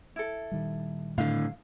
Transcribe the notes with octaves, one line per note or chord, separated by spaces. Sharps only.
E4 A4
A#2 D#3 G3
A2 D3 F5